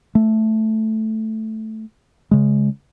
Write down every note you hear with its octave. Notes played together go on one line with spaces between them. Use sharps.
A3
C#3 G#3